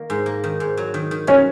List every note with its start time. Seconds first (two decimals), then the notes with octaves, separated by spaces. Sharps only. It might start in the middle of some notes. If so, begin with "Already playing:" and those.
Already playing: D#3 A#3
0.10 G#2
0.26 A#3
0.44 D#3
0.60 G#2
0.77 F#3
0.94 D#3
1.11 D#3
1.27 F#3 C#4